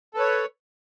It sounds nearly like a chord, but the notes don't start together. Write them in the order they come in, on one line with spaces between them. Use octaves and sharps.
A4 B4 C#5